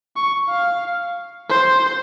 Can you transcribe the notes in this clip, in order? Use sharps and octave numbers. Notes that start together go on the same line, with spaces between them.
C#6
F5
C5